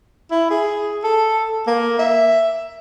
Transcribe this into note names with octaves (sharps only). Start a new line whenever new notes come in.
E4
G#4
A4
A#3
E5